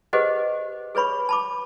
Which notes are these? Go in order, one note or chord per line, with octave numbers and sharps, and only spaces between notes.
G4 G#4 B4 C5 D#5 F#5
G#4 B4 C#5 B5 C#6
A5 B5 D6